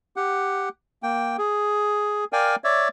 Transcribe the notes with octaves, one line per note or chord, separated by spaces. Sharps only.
G4 F#5
A#3 G5
G#4
A#4 D5 F5 G5 G#5
C#5 D5 E5